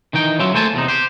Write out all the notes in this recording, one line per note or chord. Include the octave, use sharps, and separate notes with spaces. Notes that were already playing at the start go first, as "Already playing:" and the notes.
D#3 E3 D#4 G5
F#3 C#4 F4 E5
A3 A#3 C5 G#5 A5
E2 C3 D#4
G4 C5